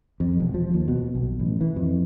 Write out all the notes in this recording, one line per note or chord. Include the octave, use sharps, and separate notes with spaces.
F2
E1
F3
D#2
B2
B1
A1
E3
F2